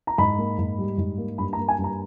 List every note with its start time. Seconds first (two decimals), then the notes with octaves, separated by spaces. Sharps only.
0.07 A#5
0.18 G#2 B5
0.38 A#3
0.59 G#2
0.79 G3
0.98 G#2
1.18 A#3
1.38 G2 B5
1.53 A#5
1.58 A#3
1.68 G#5
1.79 G2
1.84 A#5